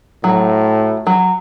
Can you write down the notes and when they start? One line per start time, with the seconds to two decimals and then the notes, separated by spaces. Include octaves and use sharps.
0.24 A2 F#3
1.07 F#3